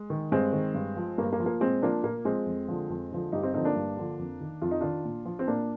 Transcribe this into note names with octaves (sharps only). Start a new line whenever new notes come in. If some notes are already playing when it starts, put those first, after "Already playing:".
Already playing: G#3
D#3
G2 G#3 C4
D#3
G2
F3
G2 A#3
A#3
F3
A#3
A#2 G#3 C4
F3 A#3 D4
A#2 A#3
F3 G#3 C4
F2
D3 F3
F2
D3 F3
G2 D#4 G4
C4 D#4
D3 F3 C4 D#4
A#3 D4
G2
D3 F3
F2
D#3
F2 F4
D#4
D#3 D4 F4
A#2
F3
C4
A#2 A#3 D4